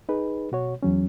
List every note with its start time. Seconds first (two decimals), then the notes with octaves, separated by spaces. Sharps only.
0.09 D#4 G#4 B4
0.52 B2 F#4 C#5
0.83 E2 F#3 C#4